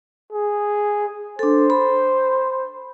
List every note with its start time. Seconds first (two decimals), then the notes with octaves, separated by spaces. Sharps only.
0.33 G#4
1.39 D4 A4 C5
1.70 B5